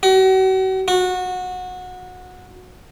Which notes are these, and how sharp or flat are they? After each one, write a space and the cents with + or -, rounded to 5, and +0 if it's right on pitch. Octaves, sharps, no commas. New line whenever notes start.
F#4 +40
F#4 -20